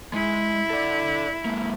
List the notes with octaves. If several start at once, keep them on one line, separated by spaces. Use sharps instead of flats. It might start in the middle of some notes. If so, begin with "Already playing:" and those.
G#3 E4
A4 D5
G#3 A#3